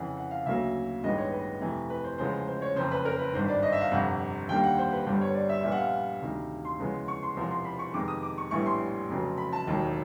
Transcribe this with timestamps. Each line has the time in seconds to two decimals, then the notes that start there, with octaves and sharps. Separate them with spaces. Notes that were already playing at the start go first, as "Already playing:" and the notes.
Already playing: F2 C#3 E3 F#5
0.17 F#5
0.31 F5
0.46 D2 C#3 F#3 A#3 E5
1.04 A1 G2 D#3 G#3 B3 D#5
1.18 C#5
1.32 B4
1.61 F2 C3 E3 A3
1.90 B4
2.04 C5
2.18 F1 E2 C#3 F3 G#3 C5
2.47 C5
2.62 C#5
2.76 F#1 F2 C#3 C5
2.91 B4
3.05 A#4
3.19 B4
3.33 G#1 G2 D#3 C5
3.48 D5
3.63 D#5
3.72 E5
3.81 F5
3.91 G1 F2 C3 F#5
4.49 D#2 D3 G3 A#3 G5
4.63 F#5
4.78 C5
4.92 B4
5.06 G1 G2 D3 G3 B3 C5
5.21 C#5
5.35 D5
5.49 E5
5.63 A#1 A#2 G3 B3 E5
5.72 F#5
5.78 F5
6.22 D2 C3 D#3
6.65 C6
6.79 E2 C#3 F3 G#3 B3
7.08 C#6
7.23 C6
7.36 E1 E2 C3 F3 C6
7.51 C6
7.65 B5
7.79 C#6
7.94 F2 C3 D#3 G#3 B3 D6
8.08 D#6
8.23 D6
8.38 C#6
8.51 A#1 A2 E3 G3 B3 C#6
8.66 C6
9.10 F1 F2 C#3 F#3
9.37 B5
9.53 A5
9.67 E1 D#2 D#3 F#3